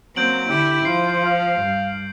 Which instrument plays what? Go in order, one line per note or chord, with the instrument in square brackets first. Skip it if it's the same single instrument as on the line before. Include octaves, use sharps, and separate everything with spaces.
[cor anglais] F#3 [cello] A#3 C4 [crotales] G6 D7 F#7
[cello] D3 E4 [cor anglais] G4
[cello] F3 [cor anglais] F4 [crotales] C7
[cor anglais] F5
[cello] G2